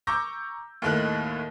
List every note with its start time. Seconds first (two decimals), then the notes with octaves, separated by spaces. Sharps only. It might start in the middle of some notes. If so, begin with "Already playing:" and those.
0.07 A#5 C#6 D6 E6 G6 A#6
0.82 D#2 A2 D#3 A3 F#6